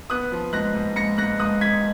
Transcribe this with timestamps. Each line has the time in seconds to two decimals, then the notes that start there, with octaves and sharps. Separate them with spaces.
0.10 B3 D#6 F#6
0.32 F3
0.53 G#2 F#6 A#6
0.75 G#2
0.96 G#2 A#6 C#7
1.18 G#2 F#6 A#6
1.39 G#2 D#6 F#6
1.61 G#2 G#6 B6